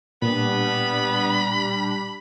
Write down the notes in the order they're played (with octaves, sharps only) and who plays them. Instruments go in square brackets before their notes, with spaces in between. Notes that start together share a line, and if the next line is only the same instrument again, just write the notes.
[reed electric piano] A#2 [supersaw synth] G3 D4 [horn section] B3 [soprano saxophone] B5